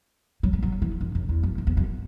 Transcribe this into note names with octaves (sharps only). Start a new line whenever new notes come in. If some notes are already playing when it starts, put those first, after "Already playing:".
F#3
G#3
F#3
E3
F#2
F#2
E2
F#2
F#2
E2
F#2